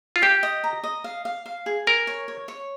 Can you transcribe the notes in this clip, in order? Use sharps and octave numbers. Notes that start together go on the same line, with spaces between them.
F4
G4 G5
D#5
A#5
D#5
F5
F5
F5
G#4
A#4 G#5
C#5
C#5
C#5